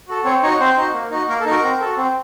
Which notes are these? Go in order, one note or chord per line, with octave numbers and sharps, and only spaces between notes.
F#4 A4
C4 C#5
D#4 F#4 C#5
C4 C5
D#4 F#4
A#3
D#4 F#4
A#3 A#4
A4
D#4
F#4 A#4
C4
F#4 A4
C4